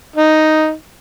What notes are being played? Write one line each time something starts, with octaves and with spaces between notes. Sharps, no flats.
D#4